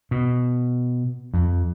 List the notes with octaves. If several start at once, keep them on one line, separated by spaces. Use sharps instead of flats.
B2
F2